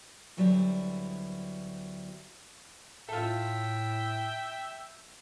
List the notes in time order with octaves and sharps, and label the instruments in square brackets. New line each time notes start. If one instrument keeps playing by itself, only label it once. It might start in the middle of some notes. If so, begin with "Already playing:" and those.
[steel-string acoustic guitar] D2 F#3 G3 B3 E4
[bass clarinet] A2 [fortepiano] F4 A4 [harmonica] E5 G5